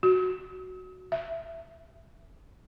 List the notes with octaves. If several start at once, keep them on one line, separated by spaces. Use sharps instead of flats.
F#4
E5